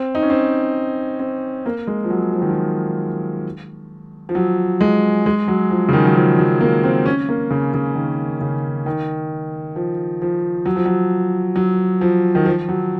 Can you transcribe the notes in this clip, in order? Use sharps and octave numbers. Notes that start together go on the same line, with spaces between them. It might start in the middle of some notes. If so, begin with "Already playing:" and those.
Already playing: C4
D#4
C#4
C4
C4
A#3
G#3
F3
F#3
F3
D#3
F3
F3
F#3
G#3
G#3
F#3
F3
C#3
D#3
F#3
F3
F#3
A#3
C4
C#4
A#3
C#3
C#3
D#3
C#3
D#3
F3
F3
F#3
F3
F#3
F#3
F3
D#3
F3
F#3